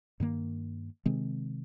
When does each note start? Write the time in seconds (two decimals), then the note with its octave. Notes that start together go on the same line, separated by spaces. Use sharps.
0.20 G2 D#3 A#3
1.06 C3 D#3 G#3 C4